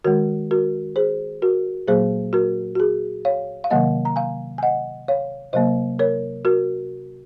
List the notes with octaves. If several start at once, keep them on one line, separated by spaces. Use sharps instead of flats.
D#3 G#3 F#4 A#4
F#4 A#4
G#4 C5
F#4 A#4
A#2 F#3 A#3 G#4 C5
F#4 A#4
F#4
G#4
C#5 F5
F5
C3 D#3 F#3 A#3 D#5 F#5
A#5
F5 G#5
G#5
D#5 F#5
C#5 F5
C3 F#3 A#3 C5 D#5
A#4 C#5
F#4 A#4